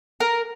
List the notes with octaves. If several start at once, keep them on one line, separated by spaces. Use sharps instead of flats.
A#4